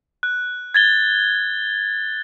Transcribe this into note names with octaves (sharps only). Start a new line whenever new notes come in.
F#6
G#6 A6 G7